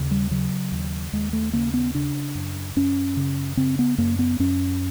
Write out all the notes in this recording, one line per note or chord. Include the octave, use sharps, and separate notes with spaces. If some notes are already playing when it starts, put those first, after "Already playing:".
Already playing: D#2 C#3
G3
C#3 F#3
D#2
D#2 G#3
A3
C#3 A#3
B3
C#3 D4
F#2
F#2 C#4
C#3
C#3 C4
B3
F#2 A#3
B3
F#2 C#4